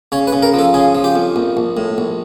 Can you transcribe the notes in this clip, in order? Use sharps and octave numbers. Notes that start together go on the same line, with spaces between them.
C#3 C#5
B4
C#3
A#4
F3 A4
C#3 G#4
F3
G4
F2
A#1
A#1
A2
A#1